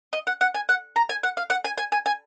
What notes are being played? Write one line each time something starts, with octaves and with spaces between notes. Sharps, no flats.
D#5
F#5
F#5
G#5
F#5
A#5
G#5
F#5
F5
F#5
G#5
G#5
G#5
G#5